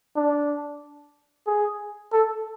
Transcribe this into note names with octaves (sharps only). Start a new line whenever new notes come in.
D4
G#4
A4